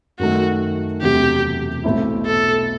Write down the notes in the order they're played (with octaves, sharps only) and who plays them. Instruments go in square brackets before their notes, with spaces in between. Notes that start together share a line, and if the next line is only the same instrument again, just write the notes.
[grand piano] F#2 D#3 A3 [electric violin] F#4
[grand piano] E1 E2 C3 F#3 A3 [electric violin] G4
[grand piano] B1 B2 A3 C4 E4
[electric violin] A4